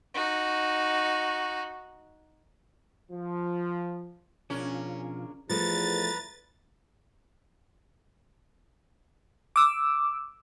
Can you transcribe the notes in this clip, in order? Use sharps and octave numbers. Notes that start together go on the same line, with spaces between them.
D#4 F#4
F3
B2 F3 C#4 D4 F4 G#4 A#4
E2 F3 A3 B4 A#5 A6
D6 E6